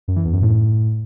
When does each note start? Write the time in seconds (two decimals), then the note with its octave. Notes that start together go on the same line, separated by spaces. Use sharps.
0.08 F#2
0.16 E3
0.25 E2
0.33 F#2
0.41 A2